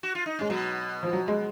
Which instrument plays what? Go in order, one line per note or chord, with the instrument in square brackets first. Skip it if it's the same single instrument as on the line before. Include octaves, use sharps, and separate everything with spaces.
[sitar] F#4
F4
D#4
[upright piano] G#3 [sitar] C#4
[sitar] B2 B3 [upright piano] F#3
[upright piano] F3
F#3
G#3